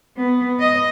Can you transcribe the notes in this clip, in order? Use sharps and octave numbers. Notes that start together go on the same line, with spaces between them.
B3
D#5